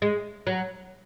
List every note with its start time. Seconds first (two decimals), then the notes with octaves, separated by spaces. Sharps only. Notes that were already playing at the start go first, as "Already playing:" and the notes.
0.02 G#3
0.47 F#3